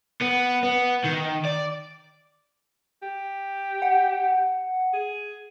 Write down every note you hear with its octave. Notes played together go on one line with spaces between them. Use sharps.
B3
B3
D#3
D5
G4
F#5
G#4